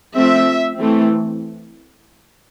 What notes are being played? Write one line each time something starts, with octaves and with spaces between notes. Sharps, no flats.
F3 A3 C4 E5
E3 A3 C4